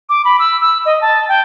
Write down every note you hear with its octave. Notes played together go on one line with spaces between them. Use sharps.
D6
B5
E6
E6
D#5
A5
G5